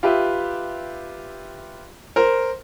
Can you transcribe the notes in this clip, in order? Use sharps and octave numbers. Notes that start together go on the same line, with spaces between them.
F4 G4 B4 E5
A#4 C5